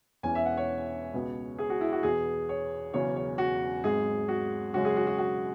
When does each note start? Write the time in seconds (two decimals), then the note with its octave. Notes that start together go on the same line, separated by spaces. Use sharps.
0.23 E1 E2 E3 C#4 G#5
0.35 E5
0.46 F#5
0.57 C#5
1.14 C#2 B2 B3
1.58 G#4
1.70 F#4
1.81 E4
1.92 F#4
2.03 E2 B2 B3 G#4
2.49 C#5
2.94 E1 E2 C#3 F#3 C#4 C#5
3.16 C#5
3.38 F#4
3.84 G#1 G#2 F#3 G#4
4.28 F#4
4.74 F#2 C#3 G#3 C#4 F#4
4.85 G#4
4.96 F#4
5.07 F#4
5.18 F#4